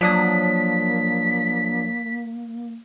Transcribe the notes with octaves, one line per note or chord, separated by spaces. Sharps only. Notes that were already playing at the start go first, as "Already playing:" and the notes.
F3 F#3 A#3 D4 D#6 B6